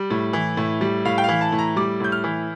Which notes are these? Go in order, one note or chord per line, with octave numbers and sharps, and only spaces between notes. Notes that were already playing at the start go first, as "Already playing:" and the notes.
Already playing: G3
A2
E3
A2
G3
A2 F5
G5
E3 F5
A5
A2
A#5
G3 D6
A2 G6
F6
E3